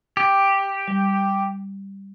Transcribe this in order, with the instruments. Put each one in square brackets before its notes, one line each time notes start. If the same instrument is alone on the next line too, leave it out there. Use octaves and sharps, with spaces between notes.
[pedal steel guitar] G4
[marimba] G3